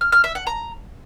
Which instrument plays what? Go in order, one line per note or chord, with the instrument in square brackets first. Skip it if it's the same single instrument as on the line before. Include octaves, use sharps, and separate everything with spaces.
[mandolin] F6
F6
E5
F#5
A#5